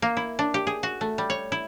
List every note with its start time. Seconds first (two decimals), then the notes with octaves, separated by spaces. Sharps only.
0.02 A#3
0.17 E4
0.39 D4
0.54 G4
0.67 G#4
0.83 F#4
1.01 A3
1.18 G3
1.30 C#5
1.52 E4